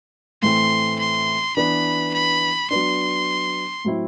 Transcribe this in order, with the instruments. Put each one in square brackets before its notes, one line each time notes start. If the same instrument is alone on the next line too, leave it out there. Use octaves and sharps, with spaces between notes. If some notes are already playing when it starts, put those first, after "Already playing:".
[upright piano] A2 E3 A3 C4 [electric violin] C6
[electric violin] C6
[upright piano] E3 B3 D4 [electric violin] B5
[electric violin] B5
[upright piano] F#3 B3 D4 [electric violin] C6
[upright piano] A2 F#3 C4 E4